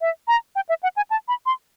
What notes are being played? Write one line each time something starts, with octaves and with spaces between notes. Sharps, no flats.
E5
A#5
G5
E5
F#5
G#5
A5
B5
C6